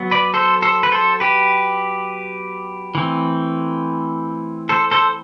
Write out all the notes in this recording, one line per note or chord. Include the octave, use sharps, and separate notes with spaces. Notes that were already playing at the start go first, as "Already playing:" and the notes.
Already playing: F#3 B3
B4 D5
A4 C5
A4 C5
B4
A4 C5
G4 B4
E3 A3 C4
A4 C5
A4 C5